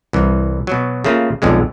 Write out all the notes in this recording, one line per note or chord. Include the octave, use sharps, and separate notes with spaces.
C2 E3
B2 F#3
C#3 A3 A#3 F4
B1 F2 D3 G#3